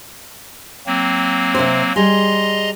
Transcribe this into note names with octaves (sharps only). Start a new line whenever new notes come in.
F#3 A#3 C4
C3 C5
G3 G#4 D#5 A#5 C6